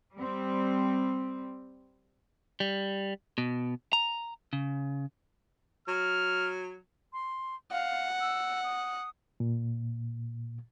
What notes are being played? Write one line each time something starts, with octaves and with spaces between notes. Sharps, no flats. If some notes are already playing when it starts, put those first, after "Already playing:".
G3 C4
G3
B2
A#5
C#3
F#3 F6
C6
F5 F#5
E6
D#6
A#2